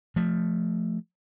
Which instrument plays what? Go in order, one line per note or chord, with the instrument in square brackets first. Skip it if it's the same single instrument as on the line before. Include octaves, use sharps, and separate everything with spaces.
[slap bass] F3 A3